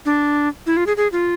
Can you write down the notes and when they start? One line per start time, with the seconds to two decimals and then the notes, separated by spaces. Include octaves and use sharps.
0.05 D4
0.66 E4
0.77 F4
0.87 G#4
0.97 G#4
1.12 F4